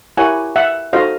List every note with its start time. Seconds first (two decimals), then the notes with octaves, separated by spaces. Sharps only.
0.17 E4 G4 A#4 C#5 F#5 G#5
0.56 E5 F#5
0.93 D#4 F#4 A4 C5 D#5 F5